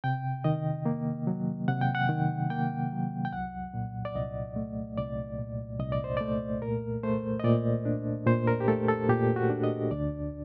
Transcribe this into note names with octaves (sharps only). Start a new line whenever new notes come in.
C3 G5
D#3 D#5
A#3
F#3
C3 F#5
G5
F#5
D#3
A#3 G5
F#3
G5
C2 F#5
A#2
D5
C2 D#5
A3
C2 D5
A#2
C2 D#5
D5
C5
A3 D5
A#2 A#4
A3 C5
D#5
A#2 D5
D4
A#2 C5
A#4
G4
A3 A4
A4
A#2 G4
F#4
D4
D#5
D2 D5